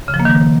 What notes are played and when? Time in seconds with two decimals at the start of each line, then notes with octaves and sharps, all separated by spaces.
0.08 C#3
0.14 F3
0.20 A#3
0.25 D#3